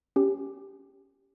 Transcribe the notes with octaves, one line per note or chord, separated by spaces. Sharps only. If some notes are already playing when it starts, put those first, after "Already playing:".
C#4 G4